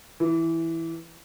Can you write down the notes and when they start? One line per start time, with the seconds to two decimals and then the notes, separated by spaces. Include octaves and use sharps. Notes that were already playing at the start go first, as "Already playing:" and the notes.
0.20 E3